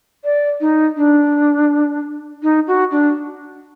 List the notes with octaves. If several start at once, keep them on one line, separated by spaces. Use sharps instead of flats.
D5
D#4
D4
D#4
F#4
D4